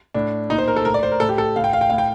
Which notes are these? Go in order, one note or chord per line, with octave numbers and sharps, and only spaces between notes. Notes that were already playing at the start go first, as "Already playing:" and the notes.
A2 D4
A#2 D#4
C5
A#4
A4
A2 A#4
D5
C5
A#4
A2 A4
G4
A4
A2 F5
G5
F5
G5
A2 F5
G5